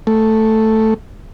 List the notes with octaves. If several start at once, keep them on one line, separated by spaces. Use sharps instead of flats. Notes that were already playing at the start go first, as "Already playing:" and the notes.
A3